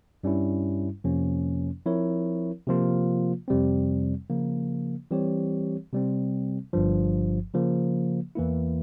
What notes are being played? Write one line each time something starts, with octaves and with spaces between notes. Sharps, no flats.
G2 G3 C#4 E4
F2 C3 F3 A#3 C#4
F3 C4 E4 A#4 C#5
C3 F3 A#3 F4
F2 C3 G3 C4
C#3 F3 A#3
E3 G3 C4 G4 C#5
C3 G3 C4
G1 G2 F3
C#3 F3 A#3
E2 E3 A#3 E4